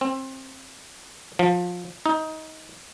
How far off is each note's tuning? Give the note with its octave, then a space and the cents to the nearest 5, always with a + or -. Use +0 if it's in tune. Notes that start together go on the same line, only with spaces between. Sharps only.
C4 +25
F3 +25
D#4 +20